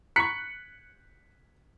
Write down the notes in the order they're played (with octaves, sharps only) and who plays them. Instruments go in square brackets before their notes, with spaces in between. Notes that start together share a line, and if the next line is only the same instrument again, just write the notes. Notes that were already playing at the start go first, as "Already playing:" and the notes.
[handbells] A#5 B5 C#6 [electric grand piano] F#6 C#7 [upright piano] B6